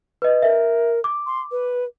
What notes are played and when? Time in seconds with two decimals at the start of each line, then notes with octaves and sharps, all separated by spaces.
0.22 B4 D#5
0.42 A#4 E5
1.04 D6
1.27 C6
1.52 B4